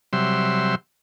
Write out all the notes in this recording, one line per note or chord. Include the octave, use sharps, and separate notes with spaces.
C3 F#3 G3 E5 C6